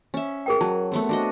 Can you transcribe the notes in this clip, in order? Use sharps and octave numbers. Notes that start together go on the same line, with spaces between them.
C#4 E5
G#4 A#4 G5
F#3 A5
A3 B3 C4
D4 F#4 D#5